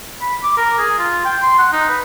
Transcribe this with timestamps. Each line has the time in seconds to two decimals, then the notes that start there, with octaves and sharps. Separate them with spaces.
0.21 B5
0.43 D6
0.57 A#4
0.78 G#4
0.99 F4
1.25 G5
1.42 C6
1.58 F#5
1.72 D#4
1.89 B4